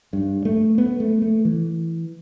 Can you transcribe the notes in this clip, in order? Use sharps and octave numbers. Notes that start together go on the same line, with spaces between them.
G2
A3
B3
A3
A3
E3